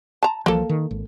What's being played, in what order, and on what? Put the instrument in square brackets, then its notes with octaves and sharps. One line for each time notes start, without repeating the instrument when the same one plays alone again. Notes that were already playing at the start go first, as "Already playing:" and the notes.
[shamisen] A5 A#5
[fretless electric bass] C2 E3 F3 [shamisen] A#3 A4
[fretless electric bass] D#3
G#1